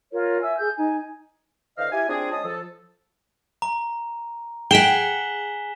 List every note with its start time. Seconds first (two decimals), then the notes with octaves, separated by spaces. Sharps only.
0.12 F4 A#4 C#5
0.40 E5 G#5 E6
0.58 G#4 G6
0.76 D#4 G#5
1.78 D3 E3 C5 D#5 F5
1.92 E4 G4 G#5
2.09 C4 D4 F4 G#4
2.32 G#3 C#4 A5 D#6
2.45 F3 A4
3.62 A#5
4.71 G#4 F#5 G5 B6 E7 G7